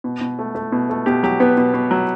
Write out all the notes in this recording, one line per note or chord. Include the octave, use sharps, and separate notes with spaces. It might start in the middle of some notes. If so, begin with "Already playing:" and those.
B2
B2
A3
A3
B2
A3
B2 G4
F#3 G4
B2 B3
B2
B2
F#3